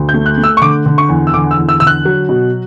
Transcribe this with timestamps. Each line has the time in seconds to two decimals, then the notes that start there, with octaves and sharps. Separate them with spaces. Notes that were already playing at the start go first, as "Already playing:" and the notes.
Already playing: D2
0.09 G6
0.14 A3
0.26 F#6
0.38 A3
0.44 E6
0.57 C#6
0.61 D3 D6
0.86 D3
0.98 C#6
1.09 E2
1.27 E6
1.34 D3 D6
1.51 E6
1.57 E2
1.69 E6
1.80 D3 E6
1.87 F#6
2.05 F#3
2.29 B2